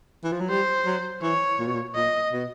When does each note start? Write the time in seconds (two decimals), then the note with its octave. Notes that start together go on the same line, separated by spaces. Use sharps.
0.24 E3
0.32 F3
0.40 F#3
0.50 G3 C5
0.86 F#3
1.22 E3 C#5
1.59 A#2
1.67 B2
1.74 A#2
1.95 A#2 D#5
2.33 B2